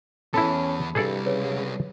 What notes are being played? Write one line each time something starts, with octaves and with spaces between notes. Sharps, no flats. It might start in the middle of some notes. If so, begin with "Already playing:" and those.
E2 B3 C#4 E4 A4 A5 B5
C2 G2 G3 G#4 A4 D5
C#3 B4 C#5